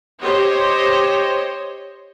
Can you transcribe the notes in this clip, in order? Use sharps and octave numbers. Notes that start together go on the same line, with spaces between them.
G4 C5 C#5 D#5